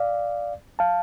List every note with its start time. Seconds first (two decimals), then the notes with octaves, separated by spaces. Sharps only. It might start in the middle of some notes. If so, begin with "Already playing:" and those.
Already playing: D5 F5
0.79 F5 A5